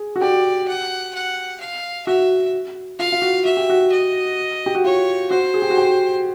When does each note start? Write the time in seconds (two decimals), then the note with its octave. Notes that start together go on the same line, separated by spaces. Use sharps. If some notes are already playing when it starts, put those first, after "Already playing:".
Already playing: G#4
0.16 F#4
0.21 G4 D5
0.67 F#5
1.15 F#5
1.60 F5
2.06 F#4 E5
2.99 F4 F5
3.12 F4
3.22 F#4
3.45 F#4 E5
3.57 G4
3.70 F#4
3.92 D#5
4.66 G4
4.75 F#4
4.84 F4 C#5
5.31 F#4 C5
5.54 G#4
5.62 G4
5.70 F#4
5.77 G4